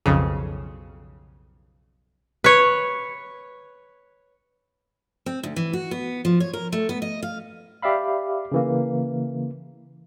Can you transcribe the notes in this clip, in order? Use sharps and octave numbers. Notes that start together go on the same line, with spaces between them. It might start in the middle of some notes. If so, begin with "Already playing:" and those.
B1 F2 C#3
B4 C#5
C4
D2
E3
F#4
B3
F3
C#5
A#4
A3
B3
D#5
F5
G4 D5 E5 F5 B5
C#3 E3 A#3